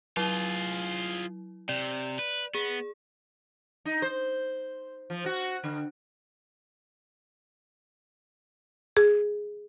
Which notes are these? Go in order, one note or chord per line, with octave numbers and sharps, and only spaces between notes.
F#3 E4 F4 G#4
C3 D5
B4
B3 G#4
D#4
C5
F3
F#4
D3
G#4